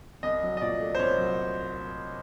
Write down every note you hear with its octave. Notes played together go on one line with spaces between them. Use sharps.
C2 D#5
F#3
D#5
A#2 D5
A3
C5
C2 C#5
F#3